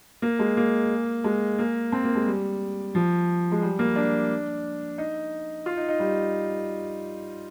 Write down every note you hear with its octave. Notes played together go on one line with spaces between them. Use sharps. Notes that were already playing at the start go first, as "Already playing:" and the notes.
A#3
G#3
A#3
G#3
A#3
C4
A#3
G#3
G3
F3
G#3
G3
A#3
D4
D#4
F4
D#4
D#4
G3